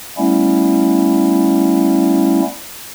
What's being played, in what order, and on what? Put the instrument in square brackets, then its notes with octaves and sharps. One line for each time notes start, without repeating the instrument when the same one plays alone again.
[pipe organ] G3 A3 B3 C#4 E4